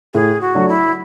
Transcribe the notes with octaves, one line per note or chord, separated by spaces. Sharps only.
A2 G#4
F#4
F#3 A3 D4
E4